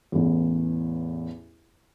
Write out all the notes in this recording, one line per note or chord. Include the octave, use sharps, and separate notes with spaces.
A1 E2